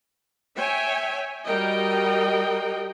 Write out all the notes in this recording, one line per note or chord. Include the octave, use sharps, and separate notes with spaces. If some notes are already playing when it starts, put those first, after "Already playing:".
C#5 E5 G5 G#5
G3 F#4 A#4 D#5 G5